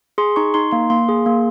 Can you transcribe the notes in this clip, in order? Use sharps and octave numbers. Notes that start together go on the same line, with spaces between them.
G#4 C6
D#4 C#6
D#4 C6
A#3 C6
A#3 C6
G#4
A#3